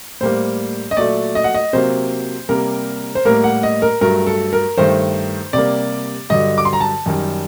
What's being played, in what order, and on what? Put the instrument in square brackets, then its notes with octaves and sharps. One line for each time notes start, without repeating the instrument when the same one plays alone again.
[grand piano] A2 G3 A#3 C5
D#5
A#2 F#3 A3 D5
D#5
F#5
D#5
C3 F#3 A#3 C5
C3 G3 A#3 A#4
C5
A2 G3 A#3 A#4
F#5
D#5
A#4
G2 F#3 A3 A#4
A4
A#4
G2 D#3 A3 C5
C3 G3 A#3 D5
G2 D3 F#3 D#5
D6
C6
A#5
A5
F#2 D#3 G3